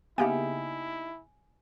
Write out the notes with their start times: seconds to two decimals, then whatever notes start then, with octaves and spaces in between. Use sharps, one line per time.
0.18 C#3 A#3 B3 D#4 E4 G4 E5 G#5